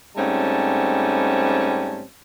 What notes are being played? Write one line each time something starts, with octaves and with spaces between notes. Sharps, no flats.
G#2 G3 A3 C4 C#4 A5